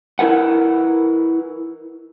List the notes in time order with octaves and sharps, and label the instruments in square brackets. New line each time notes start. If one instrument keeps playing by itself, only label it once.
[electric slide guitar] E4 A#4 B4 F#5